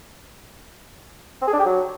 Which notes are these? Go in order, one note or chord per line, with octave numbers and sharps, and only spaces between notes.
C4
G#4
D4
G4
F#3